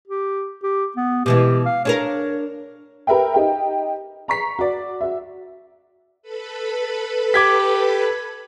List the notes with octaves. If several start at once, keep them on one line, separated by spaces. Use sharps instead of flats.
G4
G4
B3
B2 E3 G#3 G4
F5
D4 G#4 A#4 C#5
G4 A#4 B4 E5 G5
D#4 G4 G5
A#5 C#6 B6 C7
F#4 D5
F#4 E5
A4 B4 B5
G4 D6 G#6 B6